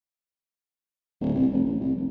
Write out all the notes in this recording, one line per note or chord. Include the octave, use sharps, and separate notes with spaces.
D1
C2
F1
A1
C2
F1